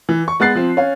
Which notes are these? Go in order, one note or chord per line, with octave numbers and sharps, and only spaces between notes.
E3
C#6
G#3 B3 F#6 A6 C7
F3 C4
C#4 F5